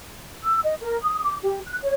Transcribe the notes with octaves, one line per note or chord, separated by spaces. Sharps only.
E6
D#5
A#4
D#6
D6
G4
F#6
C#5